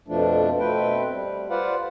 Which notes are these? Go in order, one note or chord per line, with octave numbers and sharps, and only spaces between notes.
F2 B2 F3 A3 D4
B2 A3 C4 B4 G5
G3
F4 B4 C5 D5 F5 F#5